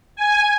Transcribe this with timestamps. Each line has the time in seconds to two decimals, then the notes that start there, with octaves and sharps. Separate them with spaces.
0.16 G#5